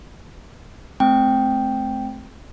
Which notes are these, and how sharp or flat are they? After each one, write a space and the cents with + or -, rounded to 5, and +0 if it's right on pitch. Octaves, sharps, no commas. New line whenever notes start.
A3 -25 C4 +0 G5 +0